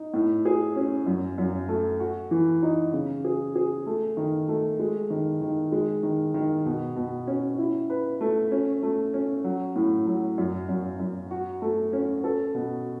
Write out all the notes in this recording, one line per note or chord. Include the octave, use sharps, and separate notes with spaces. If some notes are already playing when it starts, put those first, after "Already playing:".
Already playing: D#4
A2
G#4
C#4
F#2
F#2
A3
F#4
E3
D#4
C#3
G#4
G#4
A3
D#3
A3
G#3
D#3
D#3
G#3
D#3
D#3
B2
B2
C#4
E4
B4
A3
C#4
A3
C#4
F#3
A2
F#3
F#2
F#2
F#2
F#4
A3
C#4
A4
B2